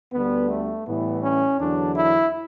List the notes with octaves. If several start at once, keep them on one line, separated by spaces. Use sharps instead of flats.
D2 D3 G3 B3
A3
A2 E3 G3 B3
C#4
E2 D3 F#3 D4
E4